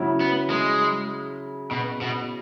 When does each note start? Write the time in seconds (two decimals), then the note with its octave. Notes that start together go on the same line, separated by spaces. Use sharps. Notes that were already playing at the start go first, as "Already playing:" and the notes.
Already playing: C#3 F#3 E4
0.20 B3
0.50 G#3
1.71 B2
2.01 B2